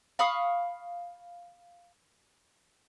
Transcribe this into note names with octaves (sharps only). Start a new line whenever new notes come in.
F5 B5 C#6 D#6